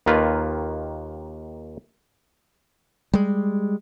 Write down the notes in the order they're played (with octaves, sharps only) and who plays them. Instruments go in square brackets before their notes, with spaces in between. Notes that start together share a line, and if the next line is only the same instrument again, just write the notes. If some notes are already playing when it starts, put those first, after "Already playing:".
[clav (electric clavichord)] D#2 D#3 A#3 F4 B4
[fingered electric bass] G3 G#3